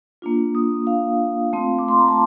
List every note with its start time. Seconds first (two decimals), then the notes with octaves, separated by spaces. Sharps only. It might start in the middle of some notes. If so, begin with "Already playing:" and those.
0.22 A#3 D4 F4
0.55 D#6
0.87 F5
1.53 A3 C4 F4
1.79 D6
1.88 C6
1.99 A#5
2.08 A5